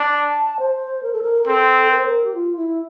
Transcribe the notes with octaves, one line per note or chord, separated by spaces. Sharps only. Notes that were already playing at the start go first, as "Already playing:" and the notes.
Already playing: D4
A5
C5
A#4
A4
A#4
A#4
C4 A4
A#4
C5
A#4
G4
F4
E4